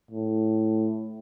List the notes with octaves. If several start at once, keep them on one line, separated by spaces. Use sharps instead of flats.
A2